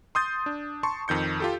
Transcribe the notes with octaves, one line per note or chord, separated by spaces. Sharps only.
C6 D#6 G6 A6
D4
A5 C6 C#6
F2 D#3 G6 C#7
F4 G4 A4